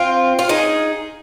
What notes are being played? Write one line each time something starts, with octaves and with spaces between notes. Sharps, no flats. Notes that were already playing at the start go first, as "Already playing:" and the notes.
Already playing: C4 F4
F4
D#4 G#4